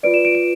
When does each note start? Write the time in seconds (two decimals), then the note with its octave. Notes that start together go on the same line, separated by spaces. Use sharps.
0.03 F4 B4 D5 D7
0.14 E7
0.25 D7
0.35 D7